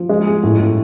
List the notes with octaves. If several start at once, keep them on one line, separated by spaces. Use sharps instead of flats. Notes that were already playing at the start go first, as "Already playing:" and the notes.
Already playing: F3
G#3
G#4
A2
A2